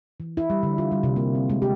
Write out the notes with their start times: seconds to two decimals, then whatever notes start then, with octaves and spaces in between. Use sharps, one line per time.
0.20 E3
0.37 E4
0.50 G3
0.63 D3
0.78 F4
0.92 G3
1.03 C3
1.16 A#3
1.35 C4
1.50 G#3
1.62 G4